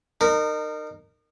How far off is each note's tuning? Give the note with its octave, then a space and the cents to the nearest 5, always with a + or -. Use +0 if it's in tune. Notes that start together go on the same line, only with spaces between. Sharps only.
D#4 -35 A#4 -15